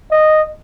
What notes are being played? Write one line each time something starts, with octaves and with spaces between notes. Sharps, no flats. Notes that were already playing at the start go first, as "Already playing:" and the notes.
D#5